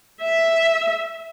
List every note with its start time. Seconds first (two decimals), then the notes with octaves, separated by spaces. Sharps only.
0.21 E5